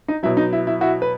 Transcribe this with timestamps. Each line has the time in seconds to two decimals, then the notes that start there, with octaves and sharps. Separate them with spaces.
0.08 D#4
0.23 B2 F#3 E4
0.37 D#4
0.53 E4
0.67 E4
0.81 E4 F#4
1.02 B4